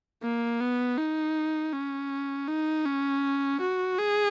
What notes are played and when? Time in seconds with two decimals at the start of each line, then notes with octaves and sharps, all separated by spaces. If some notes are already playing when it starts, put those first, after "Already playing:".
0.23 A#3
0.60 B3
0.98 D#4
1.73 C#4
2.48 D#4
2.85 C#4
3.61 F#4
3.98 G#4